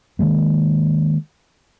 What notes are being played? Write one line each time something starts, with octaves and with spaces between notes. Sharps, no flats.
D#3 F#3 G#3 A#3